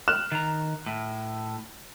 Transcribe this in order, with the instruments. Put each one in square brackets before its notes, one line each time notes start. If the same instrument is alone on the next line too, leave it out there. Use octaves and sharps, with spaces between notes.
[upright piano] F6 F#6 E7
[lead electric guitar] D#3 A#5
A2